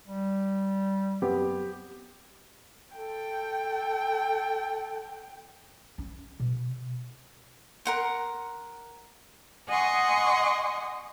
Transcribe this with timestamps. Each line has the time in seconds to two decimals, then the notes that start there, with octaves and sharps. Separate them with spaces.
0.08 G3
1.22 F#2 B3 C4 G4
2.96 A4 G5
5.98 C#4
6.40 B2
7.85 A#4 F#5 C6
9.68 D#5 F#5 G#5 C6 C#6 D#6